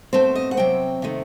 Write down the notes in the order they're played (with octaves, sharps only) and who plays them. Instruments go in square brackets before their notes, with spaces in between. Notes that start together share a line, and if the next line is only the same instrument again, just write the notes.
[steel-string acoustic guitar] B2 A3 C4 C5
D#5
F#5
C3 F#3 C4 G5
C3 D#3 A3